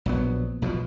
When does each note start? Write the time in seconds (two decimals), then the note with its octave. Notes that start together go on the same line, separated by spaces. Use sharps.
0.06 A#1 F#3 B3
0.62 B1 B2 E3 F3